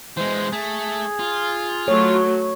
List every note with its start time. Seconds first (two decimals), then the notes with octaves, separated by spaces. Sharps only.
0.17 E3 G#3 C5
0.52 A3 G#4
1.19 F4
1.88 F#3 A3 C#5